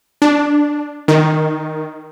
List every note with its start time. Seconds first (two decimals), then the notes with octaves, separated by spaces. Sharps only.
0.22 D4
1.08 D#3